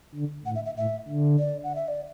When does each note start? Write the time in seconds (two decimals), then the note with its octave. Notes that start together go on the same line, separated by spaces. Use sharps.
0.15 D3
0.45 A2 F#5
0.55 E5
0.66 E5
0.77 A2 E5
1.08 D3
1.39 D5
1.64 F#5
1.75 E5
1.88 D5